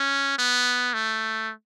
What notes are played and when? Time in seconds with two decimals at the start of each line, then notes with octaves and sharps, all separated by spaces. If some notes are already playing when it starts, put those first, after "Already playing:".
Already playing: C#4
0.39 B3
0.94 A3